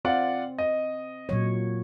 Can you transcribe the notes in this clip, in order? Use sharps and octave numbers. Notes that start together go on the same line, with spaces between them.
C4 F4 D5 F#5
D#5
A#2 F#3 C#5